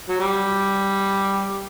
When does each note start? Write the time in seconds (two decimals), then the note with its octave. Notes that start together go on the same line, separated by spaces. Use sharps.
0.08 F#3
0.20 G3